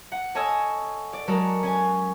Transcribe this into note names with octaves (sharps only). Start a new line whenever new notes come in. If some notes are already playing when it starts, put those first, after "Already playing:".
F#5
A4 C#5 D#5 G#5 D#6 E6
D5
F#3 G#3 F#4 A4 A#4
C#4 G#5